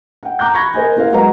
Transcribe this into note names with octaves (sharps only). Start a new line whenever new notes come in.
F#5 G5
A#5 D6 F#6 G6
B5 C#6 G#6 A#6
A#4 C5 D#5 G#5
A#3 E4 A#4 C5 F5 F#5
F#3 G#3 F#4 B4 D#5 A#5